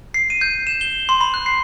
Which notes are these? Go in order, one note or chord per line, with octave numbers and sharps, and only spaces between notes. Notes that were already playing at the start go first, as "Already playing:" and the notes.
C7
D#7
G6
E7
G7
C6
B5
F#6
C7